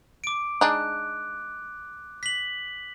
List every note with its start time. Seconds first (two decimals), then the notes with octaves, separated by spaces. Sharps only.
0.24 D6 D7
0.61 G#3 D4 D#4 F#6
2.23 B6 F#7